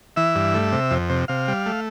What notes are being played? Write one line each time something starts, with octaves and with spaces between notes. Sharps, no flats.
E3 E5
G2
A3
C3
F2
C3
C3 F5
G3
A3